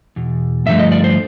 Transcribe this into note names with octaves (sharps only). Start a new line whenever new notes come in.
E2 B2
G2 D3 F3 A3 E5
D#5
D5
C5